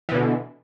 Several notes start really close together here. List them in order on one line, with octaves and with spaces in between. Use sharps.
E3 B2 D3